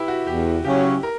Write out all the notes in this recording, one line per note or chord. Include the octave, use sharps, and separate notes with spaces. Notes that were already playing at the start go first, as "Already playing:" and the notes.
Already playing: E4 G4 B4
F#4
E2 G4
C#3 F#3 C#4 G4
A#4